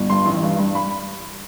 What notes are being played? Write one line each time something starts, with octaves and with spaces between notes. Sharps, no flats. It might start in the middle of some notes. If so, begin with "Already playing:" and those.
Already playing: G1
G2 C6
A1
G2
G2
B5